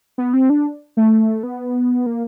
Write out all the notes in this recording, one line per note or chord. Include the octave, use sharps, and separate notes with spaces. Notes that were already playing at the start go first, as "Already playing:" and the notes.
B3
C4
D4
A3
B3
A#3